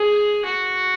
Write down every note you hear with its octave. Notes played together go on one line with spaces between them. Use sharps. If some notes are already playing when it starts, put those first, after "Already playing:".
Already playing: G#4
F#4